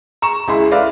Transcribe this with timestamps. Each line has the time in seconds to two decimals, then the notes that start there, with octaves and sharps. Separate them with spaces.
0.22 A#5 C#6 E7
0.48 C#2 G#3 E4 G#4 E5 C6
0.71 E4 A4 B4 D5 E5 F5